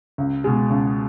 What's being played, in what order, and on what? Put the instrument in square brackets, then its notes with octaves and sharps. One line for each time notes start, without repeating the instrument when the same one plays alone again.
[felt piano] C#2
B2 G#3
C#2